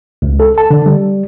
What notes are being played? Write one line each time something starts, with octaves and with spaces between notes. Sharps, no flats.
C#2
A4
A5
D3
G3